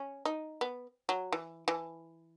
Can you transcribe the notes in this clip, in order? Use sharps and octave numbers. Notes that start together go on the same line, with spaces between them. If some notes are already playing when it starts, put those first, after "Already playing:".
Already playing: C#4
D#4
B3
F#3
E3
E3